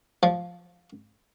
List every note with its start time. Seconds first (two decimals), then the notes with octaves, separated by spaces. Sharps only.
0.23 F3